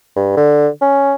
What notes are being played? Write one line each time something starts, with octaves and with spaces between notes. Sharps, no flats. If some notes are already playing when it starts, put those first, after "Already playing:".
G2
D3
C#4